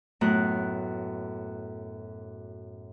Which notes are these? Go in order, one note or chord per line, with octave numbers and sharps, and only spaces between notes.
F#2 A2 B3 F#6